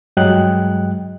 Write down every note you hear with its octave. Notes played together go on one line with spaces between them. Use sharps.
G2 F#3 G#3 D#5 G5 F#6